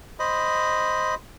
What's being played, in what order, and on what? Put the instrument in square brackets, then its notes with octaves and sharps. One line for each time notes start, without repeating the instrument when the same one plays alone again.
[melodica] C5 D#5 B5